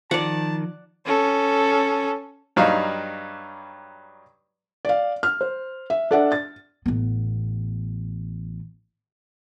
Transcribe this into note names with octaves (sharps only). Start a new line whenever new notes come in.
D#3 F3 D5 F#5 A5
C#4 A4
G2 F#3 G3 D#4 F5
D5 F5
F6
C5
E5
D4 A4 D5 E5 F#5
A6
A1 B3